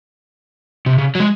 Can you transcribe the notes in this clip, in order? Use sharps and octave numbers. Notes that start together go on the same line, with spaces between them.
C3
C#3
F#3
G#3